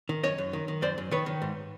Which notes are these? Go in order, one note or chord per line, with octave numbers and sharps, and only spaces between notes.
D#3
F#2 C#5 D#5
F#2
D#3
D#3
F#2 C5 D5
F#2
D#3 B4 C#5
D#3
G#2